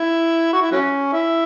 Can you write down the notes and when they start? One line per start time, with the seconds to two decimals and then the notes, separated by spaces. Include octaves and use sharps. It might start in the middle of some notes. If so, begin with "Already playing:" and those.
Already playing: E4
0.53 F#4
0.62 E4
0.72 F#3 C#4
1.13 E4